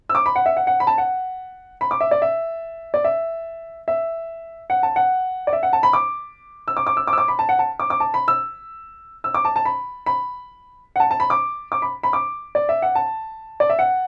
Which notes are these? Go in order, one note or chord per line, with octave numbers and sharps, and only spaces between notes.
E6
D6
B5
F#5
E5
F#5
F#5
B5
A5
F#5
B5
D6
E5
D5
E5
D5
E5
E5
F#5
A5
F#5
D5
E5
F#5
A5
B5
D6
E6
D6
D6
E6
D6
E6
D6
B5
A5
F#5
A5
D6
D6
A5
B5
E6
E6
D6
A5
A5
B5
B5
F#5
A5
A5
B5
D6
D6
B5
B5
D6
D5
E5
F#5
A5
D5
E5
F#5